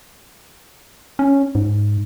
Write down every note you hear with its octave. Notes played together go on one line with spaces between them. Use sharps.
C#4
G#2